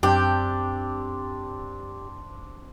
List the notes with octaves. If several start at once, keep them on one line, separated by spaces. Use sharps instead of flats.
F#2 C4 D4 G4